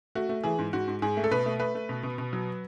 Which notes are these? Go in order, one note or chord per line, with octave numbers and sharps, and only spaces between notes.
A3 F#4
A3
E3 G#4
G#2
G#2 F#4
G#2
G#2 G#4
A3
A4
B2 B4
A3
A3 B4
A3
B2
B2
B2
F#3